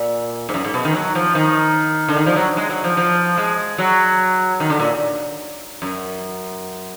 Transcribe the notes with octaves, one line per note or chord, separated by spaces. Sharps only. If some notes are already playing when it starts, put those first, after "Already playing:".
Already playing: A#2
G#2
F#2
G#2
B2
D#3
F#3
F3
D#3
D3
D#3
F3
F#3
G#3
F#3
F3
F3
G#3
F#3
D#3
D3
A#2
F#2